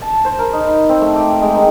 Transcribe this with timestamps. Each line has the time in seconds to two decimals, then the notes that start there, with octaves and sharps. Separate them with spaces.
0.01 A5
0.25 C5
0.39 A#4
0.53 D#4
0.65 B5
0.89 C4
1.01 A3
1.15 G4
1.30 G4
1.42 G#3
1.54 D#3